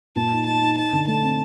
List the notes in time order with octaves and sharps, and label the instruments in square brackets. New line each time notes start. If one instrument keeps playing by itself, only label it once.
[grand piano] A#2 [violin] A5
[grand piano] D#4
[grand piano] D#4 [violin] A5
[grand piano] D#4
[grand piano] D#4 [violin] A5
[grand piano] D3
[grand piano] A3 [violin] A5
[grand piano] C4